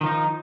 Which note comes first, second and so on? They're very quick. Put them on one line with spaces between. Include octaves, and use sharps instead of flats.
D#3 F3 D#4